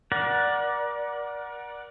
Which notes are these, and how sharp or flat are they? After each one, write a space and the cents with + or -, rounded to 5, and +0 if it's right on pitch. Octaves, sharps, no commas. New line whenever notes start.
A#4 +35 D5 +0 F#5 +0